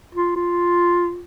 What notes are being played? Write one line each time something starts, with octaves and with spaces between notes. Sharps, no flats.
F4
F4